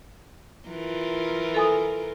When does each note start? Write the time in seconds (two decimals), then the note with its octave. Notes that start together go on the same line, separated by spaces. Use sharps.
0.68 E3 F4 A#4
1.54 A4 G#5 D#6